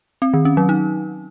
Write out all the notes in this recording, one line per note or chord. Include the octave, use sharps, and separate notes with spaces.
C4
D#3
C#4
F#3
D#4